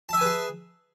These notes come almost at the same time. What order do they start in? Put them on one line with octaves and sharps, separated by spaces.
A5 E5 G#5 B4 G#4